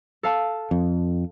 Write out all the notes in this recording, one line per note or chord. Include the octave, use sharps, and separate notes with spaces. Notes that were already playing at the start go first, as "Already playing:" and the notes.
A4 F5 A5
F2